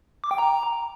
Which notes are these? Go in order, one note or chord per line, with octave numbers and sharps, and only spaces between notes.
D6
G5
A#5